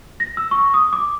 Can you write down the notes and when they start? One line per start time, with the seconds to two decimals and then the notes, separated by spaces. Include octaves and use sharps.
0.20 A#6
0.37 E6
0.51 C#6
0.74 D#6
0.93 D6